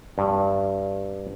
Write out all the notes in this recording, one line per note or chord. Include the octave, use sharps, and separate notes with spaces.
G2